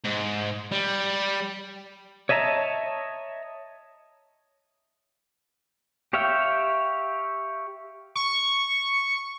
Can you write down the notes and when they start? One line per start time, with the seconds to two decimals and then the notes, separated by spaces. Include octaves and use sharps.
0.04 G#2
0.72 G3
2.29 C#5 D#5 E5 A5 A#5
6.13 G4 C#5 E5 F5 G5
8.15 C#6